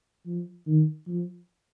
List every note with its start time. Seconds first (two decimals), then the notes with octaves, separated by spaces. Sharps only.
0.27 F3
0.67 D#3
1.07 F3